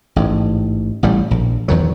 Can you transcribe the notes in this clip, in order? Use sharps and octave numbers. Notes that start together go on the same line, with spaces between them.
A1 G#2
A1 A2 G3
A#1
E2 D#3 F#3